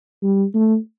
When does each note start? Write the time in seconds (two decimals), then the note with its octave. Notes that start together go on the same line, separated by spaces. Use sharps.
0.23 G3
0.54 A3